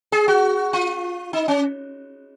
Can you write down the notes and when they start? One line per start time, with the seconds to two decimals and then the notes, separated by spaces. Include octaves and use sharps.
0.12 G#4
0.28 F#4
0.73 F4
1.33 D#4
1.48 C#4